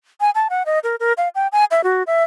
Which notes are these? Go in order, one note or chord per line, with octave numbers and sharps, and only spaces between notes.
G#5
A5
F#5
D#5
A#4
A#4
F5
G5
G#5
E5
F#4
E5